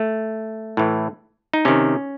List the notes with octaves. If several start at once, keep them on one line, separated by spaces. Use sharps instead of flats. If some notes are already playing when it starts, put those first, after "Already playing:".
Already playing: A3
A2 E3
D#4
C3 D#3 C#4